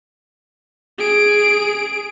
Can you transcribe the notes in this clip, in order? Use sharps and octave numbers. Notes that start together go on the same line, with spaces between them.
G#4 D7